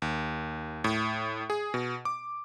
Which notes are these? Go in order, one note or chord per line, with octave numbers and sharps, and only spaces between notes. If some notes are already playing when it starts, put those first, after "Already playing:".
D#2
A2
G#4
B2
D6